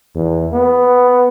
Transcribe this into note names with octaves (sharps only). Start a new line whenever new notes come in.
E2
B3